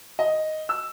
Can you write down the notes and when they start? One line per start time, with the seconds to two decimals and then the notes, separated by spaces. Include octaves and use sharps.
0.19 D#5
0.69 E6